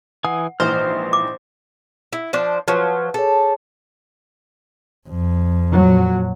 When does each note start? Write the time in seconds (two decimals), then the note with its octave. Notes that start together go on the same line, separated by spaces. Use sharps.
0.25 E3 F#5 G#5 D#6
0.60 A#1 G#2 E3 C5 F6
1.13 D6
2.13 E4
2.33 F3 D4 C5
2.68 F3 F#3 B4
3.14 G#4 A4 C#5
5.08 F2
5.74 A#2 F#3